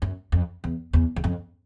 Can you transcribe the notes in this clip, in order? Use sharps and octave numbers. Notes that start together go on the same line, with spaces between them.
F#2
F2
E2
E2
E2
F2